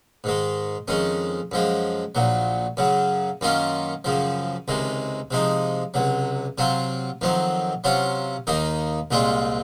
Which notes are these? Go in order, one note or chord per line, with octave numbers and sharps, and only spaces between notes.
G#2 D#3 G#3
F2 D#3 G#3 C#4
F#2 F3 G#3
A#1 A#2 F#3
F#2 C#3 F#3
F#2 D#3 A#3 C#4 F4
F#2 C#3 F3
C#2 C3 D#3 G#3
C3 F3 G#3 D#4
C#2 C3 F#3
C3 F#3 C4 F4
F2 D#3 F#3 C4
C3 F#3 C#4 F4
D#2 D#3 A#3 D#4
C2 A#2 G#3 C4 F4